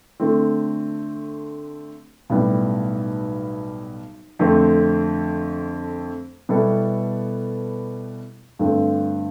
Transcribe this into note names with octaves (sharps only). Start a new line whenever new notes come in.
D3 A3 C4
B1 A2 G3 B3
F2 D3 A3 C4
B2 G3 B3 E4 A4
G2 D3 A3 C4